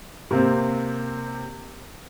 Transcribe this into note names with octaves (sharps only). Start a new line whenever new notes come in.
C3 A#3 C4